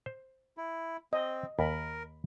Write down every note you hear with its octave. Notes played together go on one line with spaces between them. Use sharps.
C5
E4
C4 D#5
D#2 A#4 B5